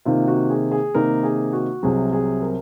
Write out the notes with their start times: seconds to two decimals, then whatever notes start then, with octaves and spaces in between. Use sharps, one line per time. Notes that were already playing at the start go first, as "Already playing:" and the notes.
0.05 C3 D#3 A#3 D#4 F4
0.28 F#4
0.50 G#4
0.72 G#4
0.95 C3 D#3 A#3 D#4 A#4
1.23 G#4
1.53 F#4
1.83 C2 C3 F#3 G#4
2.13 G#4
2.42 A#4